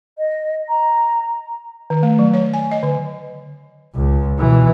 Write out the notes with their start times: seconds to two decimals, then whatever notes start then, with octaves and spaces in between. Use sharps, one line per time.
0.18 D#5
0.69 A#5
1.90 D#3
2.03 A3
2.19 F#3
2.34 C#5
2.54 G#5
2.71 D#5
2.83 D3
3.95 C#2
4.39 B2 E3